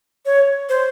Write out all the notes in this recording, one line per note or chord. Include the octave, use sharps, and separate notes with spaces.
C#5
C5